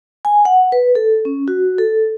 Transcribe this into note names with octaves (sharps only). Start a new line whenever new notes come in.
G#5
F#5
B4
A4
C#4
F#4
A4